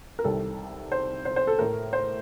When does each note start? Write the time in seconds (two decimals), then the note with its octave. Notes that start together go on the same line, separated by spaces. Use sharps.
0.19 A#4
0.24 C2 C3 D#3 G3 A4
0.92 C5
1.25 C5
1.36 C5
1.47 A4
1.59 A2 A3 A#4
1.93 C5